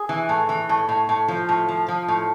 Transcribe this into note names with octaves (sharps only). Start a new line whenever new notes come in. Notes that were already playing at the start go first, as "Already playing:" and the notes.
Already playing: G#4
E3
A2
E3
A2
A2
A2
F3
A2
F3
F3
A2